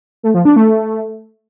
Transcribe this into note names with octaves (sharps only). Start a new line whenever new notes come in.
A3
F3
D4
A3